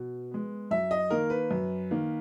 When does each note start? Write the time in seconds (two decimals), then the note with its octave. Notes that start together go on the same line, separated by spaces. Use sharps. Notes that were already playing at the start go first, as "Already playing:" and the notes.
Already playing: B2
0.31 G#3 B3
0.71 F#2 E5
0.91 D#5
1.10 D#3 A#3 A#4
1.30 B4
1.51 F#2
1.91 D#3 A#3